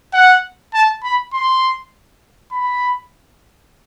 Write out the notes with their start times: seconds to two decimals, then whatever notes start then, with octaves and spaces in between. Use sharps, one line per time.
0.14 F#5
0.74 A5
1.03 B5
1.33 C6
2.52 B5